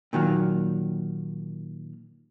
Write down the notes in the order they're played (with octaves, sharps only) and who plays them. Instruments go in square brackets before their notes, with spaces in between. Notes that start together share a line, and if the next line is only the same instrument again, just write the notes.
[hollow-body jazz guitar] A#2 D#3 F#3 A#3